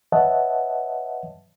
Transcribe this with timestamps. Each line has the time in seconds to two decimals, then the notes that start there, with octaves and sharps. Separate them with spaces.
0.12 B4 C#5 D#5 E5 F#5 A5